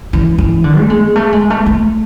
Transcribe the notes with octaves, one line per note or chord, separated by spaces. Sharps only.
E3
E3
D3
A3
G#3
A3
G#3
A3
A3